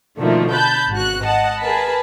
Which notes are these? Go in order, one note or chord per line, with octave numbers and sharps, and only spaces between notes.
B2 D3 D#3 F3 A3 A#3
A5 B5 F#6 G6
G#1 F#4 F#6
D#5 F#5 A5
G#4 A#4 B4 A5 B5